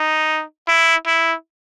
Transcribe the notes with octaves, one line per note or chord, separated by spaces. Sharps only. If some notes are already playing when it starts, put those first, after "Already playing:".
Already playing: D#4
E4
E4